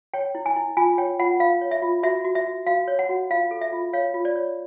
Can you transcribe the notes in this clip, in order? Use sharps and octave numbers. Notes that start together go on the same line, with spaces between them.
C#5 G5
E4
G#5
E4
F4 G#5
C#5 G5
F4 F#5
F4 F5
C#5
E5
F4
F#4 E5
F#4
E5
F#4
F#4 F5
C#5
F#5
F#4
F4 F5
A4
E5
F4
C#5 F5
F4
D5
C#5